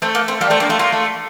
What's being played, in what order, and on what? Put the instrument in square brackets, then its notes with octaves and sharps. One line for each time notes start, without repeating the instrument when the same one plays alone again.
[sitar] A3 [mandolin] C4
[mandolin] A#3
C4
[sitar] G3 [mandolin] A#3
[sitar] A3 [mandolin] C4
[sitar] A#3 [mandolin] D4
[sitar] A3 [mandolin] F4
[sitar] A#3 [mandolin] F4
[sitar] A3